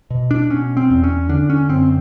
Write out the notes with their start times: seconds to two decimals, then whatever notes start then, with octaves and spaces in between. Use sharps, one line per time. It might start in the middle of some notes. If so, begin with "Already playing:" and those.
0.10 B2
0.31 D4
0.50 B2 C#4
0.77 C4
0.90 E2
1.04 C#4
1.29 D3 D4
1.50 C#4
1.69 F#2 C4